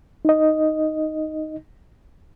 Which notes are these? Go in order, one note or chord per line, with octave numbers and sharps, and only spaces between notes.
D#4 D#5